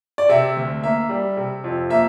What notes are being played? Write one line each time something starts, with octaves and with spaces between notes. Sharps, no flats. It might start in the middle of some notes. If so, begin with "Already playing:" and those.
D5
C3 E5
D2
A#3 E5
G3
C3
F2
A#3 E5